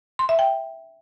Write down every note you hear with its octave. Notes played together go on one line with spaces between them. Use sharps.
C6
E5
G5